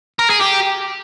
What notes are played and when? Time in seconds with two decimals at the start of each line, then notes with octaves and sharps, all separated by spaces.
0.19 A#4
0.30 G#4
0.41 G4